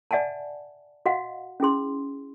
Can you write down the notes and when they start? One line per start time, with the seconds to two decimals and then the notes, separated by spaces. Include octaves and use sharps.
0.11 D5 E5 F#5 G#5 A5
1.06 F#4 D#5 F5 F#5
1.60 C#4 E4 G#4 C6